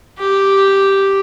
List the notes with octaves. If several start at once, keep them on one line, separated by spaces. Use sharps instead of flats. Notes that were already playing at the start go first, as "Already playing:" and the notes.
G4